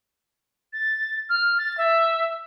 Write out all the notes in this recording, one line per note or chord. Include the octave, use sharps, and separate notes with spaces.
A6
F6
A6
E5